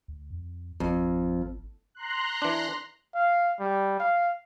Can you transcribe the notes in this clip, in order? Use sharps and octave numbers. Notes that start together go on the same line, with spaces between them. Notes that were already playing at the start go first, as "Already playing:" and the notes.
D2
F2
G#1 F2
A#5 C6 F#6
E3 D4
F5
G3
F5